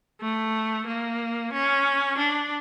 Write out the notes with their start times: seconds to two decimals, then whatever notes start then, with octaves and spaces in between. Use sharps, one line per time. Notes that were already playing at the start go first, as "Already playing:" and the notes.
0.21 A3
0.87 A#3
1.53 C#4
2.18 D4